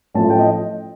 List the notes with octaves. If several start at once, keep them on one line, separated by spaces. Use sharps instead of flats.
A1 A2 F3 A5
G5
D#5